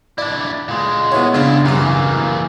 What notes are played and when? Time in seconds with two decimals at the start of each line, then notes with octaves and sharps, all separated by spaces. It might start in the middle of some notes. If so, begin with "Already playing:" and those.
0.18 D4 E4 D5
0.68 A#2 G#3
1.12 B3 E4 C#5
1.34 C#3 D4 E4 F4
1.65 C2 F#2 C#3 E3 A#3